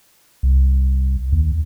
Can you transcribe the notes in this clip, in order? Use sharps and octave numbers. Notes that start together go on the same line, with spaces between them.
C2
D#2